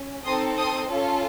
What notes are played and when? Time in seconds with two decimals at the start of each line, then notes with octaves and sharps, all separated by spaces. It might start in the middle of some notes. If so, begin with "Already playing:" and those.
Already playing: C#4
0.25 C4 D#4 A4 C6 D#6
0.57 C6 D#6
0.89 C#4 F4 A4